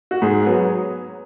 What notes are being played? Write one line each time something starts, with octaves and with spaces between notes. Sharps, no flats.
F#4
G#2 G#4
F#3 B3